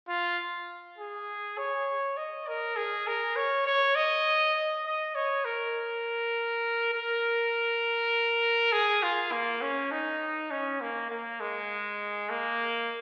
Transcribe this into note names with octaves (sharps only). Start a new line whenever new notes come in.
F4
G#4
C#5
D#5
A#4
G#4
A#4
C#5
C#5
D#5
D#5
C#5
A#4
A#4
G#4
F4
A#3
C#4
D#4
C#4
A#3
A#3
G#3
A#3